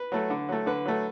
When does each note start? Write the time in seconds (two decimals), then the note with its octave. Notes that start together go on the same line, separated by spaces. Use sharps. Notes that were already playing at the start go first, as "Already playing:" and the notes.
Already playing: B4
0.12 F#3 A3
0.30 D3
0.49 F#3 A3
0.66 D3 B4
0.86 F#3 A3